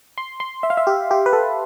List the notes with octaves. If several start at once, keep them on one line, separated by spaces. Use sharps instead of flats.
C6
C6
E5
F5
E5
G4
G4
B4
A4